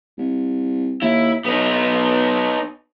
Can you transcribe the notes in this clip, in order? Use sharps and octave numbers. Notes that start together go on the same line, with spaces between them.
C2
D#2 E4
B1 B3 D#4